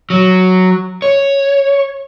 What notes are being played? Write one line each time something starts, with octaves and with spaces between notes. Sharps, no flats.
F#3
C#5